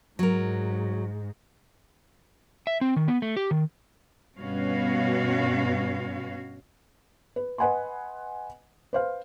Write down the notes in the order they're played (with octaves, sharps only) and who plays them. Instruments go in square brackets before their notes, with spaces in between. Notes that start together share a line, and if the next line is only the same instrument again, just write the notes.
[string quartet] G#2 [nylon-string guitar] F#3 A#4
[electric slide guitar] E5
C4
D#3
B3
A3
G4
D#3
[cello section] G2 B2 B3 C#4 F#4 F5
[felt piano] B4
B4 D#5 F#5 G#5 B5 C6
B4 C5 F5